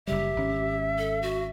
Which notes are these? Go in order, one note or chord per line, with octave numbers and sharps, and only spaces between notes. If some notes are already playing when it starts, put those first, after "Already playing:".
F#1 C#3 G3 G4 E5
G#1 C#4
A4
F#4